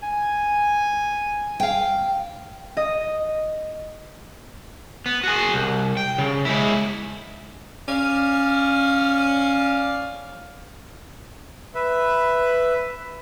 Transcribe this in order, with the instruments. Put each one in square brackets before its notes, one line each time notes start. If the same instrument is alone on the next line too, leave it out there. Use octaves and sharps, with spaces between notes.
[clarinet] G#5
[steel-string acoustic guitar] F5 G5
[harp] D#5
[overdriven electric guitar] B3
F#4 G#4
C2
G5
C#3
G#3 E4
[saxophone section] C#4 D5 F5
[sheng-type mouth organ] B4 E5